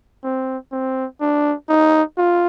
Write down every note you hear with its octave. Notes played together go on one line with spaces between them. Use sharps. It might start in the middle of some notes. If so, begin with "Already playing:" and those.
C4
C4
D4
D#4
F4